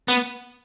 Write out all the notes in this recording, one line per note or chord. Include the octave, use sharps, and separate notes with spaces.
B3